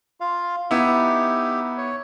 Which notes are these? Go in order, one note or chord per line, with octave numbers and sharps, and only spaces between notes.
F4 F5
B3 D#4 E4 G4
C#5